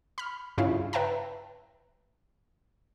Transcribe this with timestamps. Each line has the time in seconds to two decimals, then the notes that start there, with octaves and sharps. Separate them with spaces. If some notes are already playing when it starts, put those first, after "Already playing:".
0.18 B5 F6
0.58 G2 C#3 E4 F4 F5
0.93 B4 E5 G5 A5 A#5